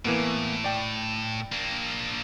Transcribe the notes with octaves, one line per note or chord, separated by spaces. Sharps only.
A2 E3 A#3 B3
D5 G5
A#3 D4